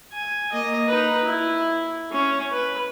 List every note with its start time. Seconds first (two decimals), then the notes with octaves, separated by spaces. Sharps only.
0.13 G#5
0.52 A#3 D#5
0.87 D#4 B4
1.24 E4
2.11 C#4
2.51 B4